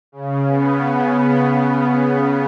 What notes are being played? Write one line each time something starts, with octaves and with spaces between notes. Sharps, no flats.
C#3
B3